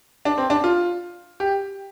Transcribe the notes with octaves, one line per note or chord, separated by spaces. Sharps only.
D4
C4
D4
F4
G4